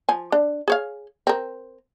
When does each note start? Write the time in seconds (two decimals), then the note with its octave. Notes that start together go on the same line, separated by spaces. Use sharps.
0.09 F3 G#5
0.32 D4
0.68 G#4 C#5 F5
1.27 C4 A#4